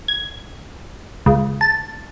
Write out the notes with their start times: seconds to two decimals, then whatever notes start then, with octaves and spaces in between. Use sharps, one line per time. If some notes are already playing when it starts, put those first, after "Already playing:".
0.08 G#6
1.26 C#2
1.61 A5